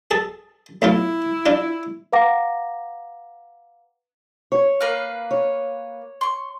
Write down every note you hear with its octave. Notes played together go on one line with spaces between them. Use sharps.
G#4 A4 A5
B1 A2 E4 F4
D4 F4
B4 F5 F#5 A#5 D6 A#6
C#5
A#3 B4 F5
C#5
C6 C#6